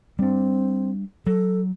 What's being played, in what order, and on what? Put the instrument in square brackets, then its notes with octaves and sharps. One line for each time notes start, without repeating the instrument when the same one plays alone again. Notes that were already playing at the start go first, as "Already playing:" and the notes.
[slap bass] G3 D4 [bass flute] C4
[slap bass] F#3 [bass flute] A4